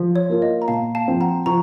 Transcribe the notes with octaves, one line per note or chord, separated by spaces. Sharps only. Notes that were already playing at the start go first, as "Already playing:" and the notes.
Already playing: F3
C#5
A#3 F4
D#5
A#5
A#2 F5 A5
F5 A5
F3 C4
F#5 A#5
F3 A#5 C#6